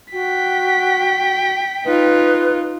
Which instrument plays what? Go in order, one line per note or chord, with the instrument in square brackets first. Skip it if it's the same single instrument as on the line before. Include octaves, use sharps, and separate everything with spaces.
[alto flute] F#4 [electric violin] G5 B6
[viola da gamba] D#4 F4 [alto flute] B4